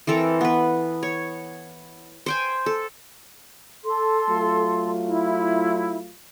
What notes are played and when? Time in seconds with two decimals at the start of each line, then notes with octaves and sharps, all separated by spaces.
0.07 E3 C4 A4 A#4
0.41 B3 B4
1.03 C#5
2.26 C5 G5 G#5
2.66 A4
3.84 A4 C6
4.29 F#3 A3 F4
5.08 E4